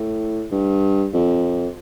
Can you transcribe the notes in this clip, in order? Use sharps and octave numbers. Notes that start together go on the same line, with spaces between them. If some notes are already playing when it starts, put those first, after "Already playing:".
Already playing: A2
G2
F2